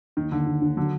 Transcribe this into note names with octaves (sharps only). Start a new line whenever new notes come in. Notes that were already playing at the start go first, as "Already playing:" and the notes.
D#2 D#3
D#2 D3
D#2
D#2
D3 F#3